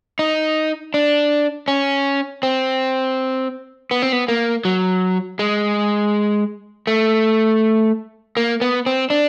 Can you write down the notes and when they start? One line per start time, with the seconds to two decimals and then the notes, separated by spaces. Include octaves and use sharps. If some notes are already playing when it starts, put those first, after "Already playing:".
0.19 D#4
0.94 D4
1.68 C#4
2.43 C4
3.91 B3
4.02 C4
4.13 B3
4.28 A#3
4.65 F#3
5.39 G#3
6.87 A3
8.37 A#3
8.61 B3
8.86 C4
9.10 D4